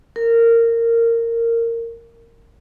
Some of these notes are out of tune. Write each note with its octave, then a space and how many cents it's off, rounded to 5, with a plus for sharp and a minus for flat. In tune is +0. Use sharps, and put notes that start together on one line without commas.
A#4 -15